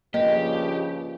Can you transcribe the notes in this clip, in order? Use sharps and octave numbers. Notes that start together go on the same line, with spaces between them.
G2 C#3 F3 A#3 G4 D#5